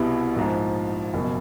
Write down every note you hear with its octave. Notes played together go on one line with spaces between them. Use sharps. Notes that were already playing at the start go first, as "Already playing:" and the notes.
Already playing: C2 B2 G3 B3 E4
A#1 G#2 F3
F#1 B2